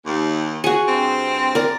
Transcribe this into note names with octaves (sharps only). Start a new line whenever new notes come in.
D#2
F#4 G#4
G2 C4
A#4 D5